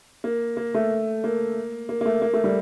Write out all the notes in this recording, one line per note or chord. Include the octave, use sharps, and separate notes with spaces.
A#3
A#3
A3
A#3
A#3
A#3
A3
A#3
A3
G3